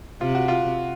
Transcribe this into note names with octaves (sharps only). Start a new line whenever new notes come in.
C3 F4
F#4
F4